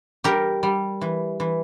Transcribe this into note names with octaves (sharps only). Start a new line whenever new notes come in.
G3 G4 A#4
G3
E3
E3